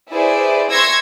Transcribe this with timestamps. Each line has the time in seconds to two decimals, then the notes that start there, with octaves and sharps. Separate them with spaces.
0.11 E4 G#4 B4 C5 D5
0.69 C6 C#6 E6 G#6 A#6